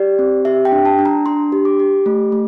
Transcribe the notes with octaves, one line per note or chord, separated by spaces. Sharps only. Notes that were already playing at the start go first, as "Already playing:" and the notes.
Already playing: G4 D5
C4
G4 E5
G5
D4
A5
D4
A#5
D4 C6
G4
D6
G4
A3
A3